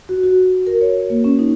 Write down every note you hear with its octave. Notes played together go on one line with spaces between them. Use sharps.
F#4
F#4
A#4
C#5
A#3
C#4
D#4